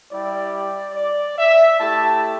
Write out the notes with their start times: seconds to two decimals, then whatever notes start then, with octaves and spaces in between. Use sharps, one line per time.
0.11 G3 E4 G4 D5
0.95 D5
1.37 E5
1.79 A3 E4 G4 A5